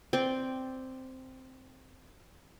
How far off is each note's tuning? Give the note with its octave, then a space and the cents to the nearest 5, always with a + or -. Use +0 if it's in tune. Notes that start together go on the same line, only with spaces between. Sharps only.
C4 -5 D5 +0 G5 +0